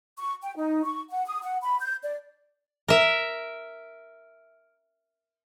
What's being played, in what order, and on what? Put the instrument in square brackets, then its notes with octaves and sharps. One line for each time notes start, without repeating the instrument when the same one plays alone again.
[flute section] C#6
G5
D#4
C#6
F#5
D#6
F#5
B5
G6
D5
[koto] A#4 E5